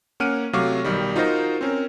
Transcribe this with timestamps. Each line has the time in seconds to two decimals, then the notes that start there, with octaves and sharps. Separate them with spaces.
0.20 A#3 C#4 F#5 F6 D7 D#7
0.53 C3 F#3 A3 F5 C#6 D6
0.84 B1 D#3 G3
1.16 D#4 F4 F#4 A#4 C5 D#5
1.61 C4 C#4 A#4